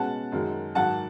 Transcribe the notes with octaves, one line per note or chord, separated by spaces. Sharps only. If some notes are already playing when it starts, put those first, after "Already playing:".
Already playing: B2 G#3 C#4 F#5 A5
F#2 D#3 G#3
G#2 D#3 F#3 F#5 A5